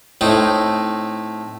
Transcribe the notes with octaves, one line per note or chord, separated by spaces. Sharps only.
A2 C4 D#4